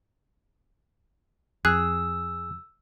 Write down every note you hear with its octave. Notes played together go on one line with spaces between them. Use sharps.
F2 G#4 E6 F#6